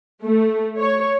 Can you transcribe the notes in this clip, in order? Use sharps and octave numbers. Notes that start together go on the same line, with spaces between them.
A3
C#5